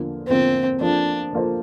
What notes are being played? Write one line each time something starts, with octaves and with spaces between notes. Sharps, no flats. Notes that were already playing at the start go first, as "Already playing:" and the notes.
Already playing: E2 D3 F3 A#3 F4
E2 D3 F3 A#3 C4 F4
F3 A#3 D4 F4 A4 C5
F3 A#3 F4 A4 C5